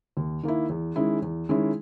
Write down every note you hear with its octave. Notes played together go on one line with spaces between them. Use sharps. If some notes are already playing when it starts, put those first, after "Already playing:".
D#2
D#3 A#3 E4
E2
D#3 G#3 C#4 E4
E2
D#3 G#3 C#4 E4